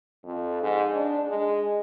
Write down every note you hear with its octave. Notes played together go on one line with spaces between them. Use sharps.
F2
G#2
D4
G#3